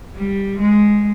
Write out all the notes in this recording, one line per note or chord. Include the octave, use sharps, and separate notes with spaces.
G3
G#3